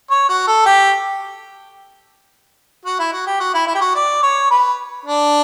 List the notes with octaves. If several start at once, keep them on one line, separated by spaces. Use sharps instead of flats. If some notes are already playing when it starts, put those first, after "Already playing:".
C#5
F#4
A4
G4
F#4
E4
F#4
G4
F#4
E4
E4
G4
F#4
D5
C#5
B4
D4